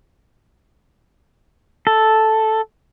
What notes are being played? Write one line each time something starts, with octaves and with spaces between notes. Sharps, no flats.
A4